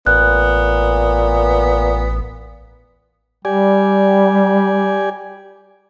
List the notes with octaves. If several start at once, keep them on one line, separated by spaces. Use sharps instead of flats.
A1 A#2 B3 F#6
G3 G4 D5 G#5